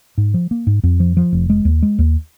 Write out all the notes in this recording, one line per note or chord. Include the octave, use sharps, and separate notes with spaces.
G#2
F3
A#3
G#2
F2
F3
F3
F1
G#3
D#2
G#3
D#2